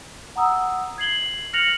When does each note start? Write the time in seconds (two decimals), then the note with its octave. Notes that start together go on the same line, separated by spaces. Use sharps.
0.36 F#5 A#5 D#6 E6
0.98 G#6 C7 F#7 G7
1.53 F6 F#6 A#6 C#7 F7 F#7